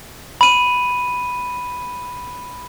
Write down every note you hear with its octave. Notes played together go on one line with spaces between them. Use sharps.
B5 D#7